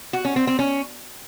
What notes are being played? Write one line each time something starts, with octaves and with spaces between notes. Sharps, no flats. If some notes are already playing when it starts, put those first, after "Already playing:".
F#4
C#4
C4
C4
C#4